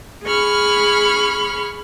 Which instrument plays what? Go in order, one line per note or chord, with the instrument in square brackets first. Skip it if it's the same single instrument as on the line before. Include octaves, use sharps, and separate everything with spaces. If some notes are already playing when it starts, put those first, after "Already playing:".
[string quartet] G#4 B5 C#6 F6